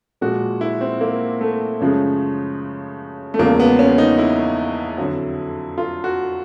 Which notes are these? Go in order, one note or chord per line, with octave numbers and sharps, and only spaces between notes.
A#2 F3 G#3 F#4
E4
C4
A#3
A3
F#2 C#3 F3 G#3
A3
E2 C#3 F3 G#3 A#3
B3
C#4
D#4
E4
F2 D3 F#3
F4
F#4